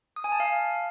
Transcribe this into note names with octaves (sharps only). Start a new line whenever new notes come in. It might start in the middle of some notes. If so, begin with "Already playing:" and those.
D#6
G#5
A5
F5